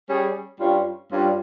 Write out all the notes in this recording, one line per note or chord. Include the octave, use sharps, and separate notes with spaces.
G3 C#4 G#4
G2 G3 C#4 F4
G2 G3 C#4 F4